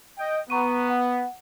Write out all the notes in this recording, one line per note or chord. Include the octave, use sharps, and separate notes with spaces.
D#5 G5
B3 A#5 C#6 D#7
F#5